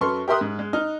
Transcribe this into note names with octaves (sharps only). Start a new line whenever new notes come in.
F#2 A4 B4 C6 C#6 F6
G4 A#4 E5 C6 D#6 F#6
G#2
G#3
D#4 F6